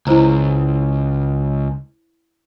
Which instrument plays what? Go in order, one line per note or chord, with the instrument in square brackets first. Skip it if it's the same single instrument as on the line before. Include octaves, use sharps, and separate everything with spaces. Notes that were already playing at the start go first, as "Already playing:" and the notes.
[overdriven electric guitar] C#2 [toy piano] E4 C5 A#5